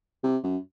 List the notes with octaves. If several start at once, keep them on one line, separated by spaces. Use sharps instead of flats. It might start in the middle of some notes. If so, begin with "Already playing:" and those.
C3
F#2